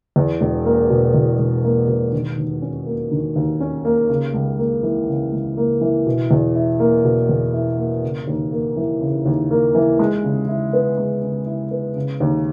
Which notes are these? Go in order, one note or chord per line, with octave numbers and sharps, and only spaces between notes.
E2
E1
A#3
B2
E2
E1
A#3
B2
D#3
D#2
C#4
A#3
D#3
D#2
C#4
A#3
C#3
C#2
A#3
E3
C#3
C#2
A#3
E3
B2
E2
E4
A#3
B2
E2
E4
A#3
C#3
D#2
A#3
E3
C#3
D#2
A#3
E3
G#3
C#3
E4
B3
G#3
C#3
E4
B3
C#3
D#2